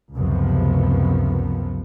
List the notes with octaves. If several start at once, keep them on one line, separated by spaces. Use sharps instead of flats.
C#2 F#2 C3 F3 B3